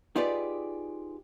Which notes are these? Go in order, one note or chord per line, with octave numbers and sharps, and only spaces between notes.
D#4 F4 G4 G#4 B4 D5